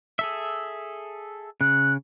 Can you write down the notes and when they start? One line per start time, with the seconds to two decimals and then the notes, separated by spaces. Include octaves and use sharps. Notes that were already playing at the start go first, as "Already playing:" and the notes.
0.19 G#4 A4 E5
1.61 C#3 F#6